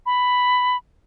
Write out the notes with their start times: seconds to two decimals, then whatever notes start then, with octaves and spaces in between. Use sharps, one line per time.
0.06 B5